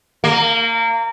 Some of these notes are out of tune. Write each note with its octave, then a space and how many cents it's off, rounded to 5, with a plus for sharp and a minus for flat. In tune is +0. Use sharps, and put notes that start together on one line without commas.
A#3 -25